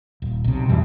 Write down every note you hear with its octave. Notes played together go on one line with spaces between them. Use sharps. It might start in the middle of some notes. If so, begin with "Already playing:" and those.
D#1
B1 C3
E2 B2 E3 G3